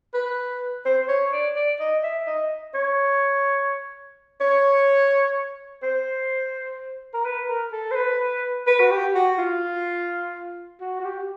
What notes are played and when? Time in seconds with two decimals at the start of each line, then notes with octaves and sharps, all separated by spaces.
0.14 B4
0.85 C5
1.09 C#5
1.32 D5
1.56 D5
1.80 D#5
2.03 E5
2.27 D#5
2.74 C#5
4.41 C#5
5.83 C5
7.14 A#4
7.25 B4
7.49 A#4
7.72 A4
7.91 C5
7.96 B4
8.67 B4
8.80 F#4
8.91 G4
9.15 F#4
9.38 F4
10.81 F#4
11.00 F#4
11.05 G4